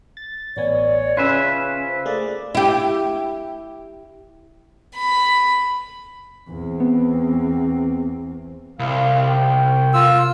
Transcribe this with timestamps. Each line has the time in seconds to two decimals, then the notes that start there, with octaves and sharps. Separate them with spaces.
0.17 A6
0.57 A1 B3 C#5 D5 G#5
1.17 C#3 C#4 F4 B4 E5 G#5
1.87 C5
2.05 A3 A#3 G#4 D5
2.55 E4 G4
4.95 B5
6.49 E2 C4
6.80 B3
8.79 C2 F5
9.15 G5
9.94 F4 E6